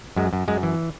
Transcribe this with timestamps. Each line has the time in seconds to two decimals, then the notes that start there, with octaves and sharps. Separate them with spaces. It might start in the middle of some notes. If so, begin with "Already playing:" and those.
0.16 F#2 G#3
0.33 F#2
0.48 F#2 G#3
0.63 E3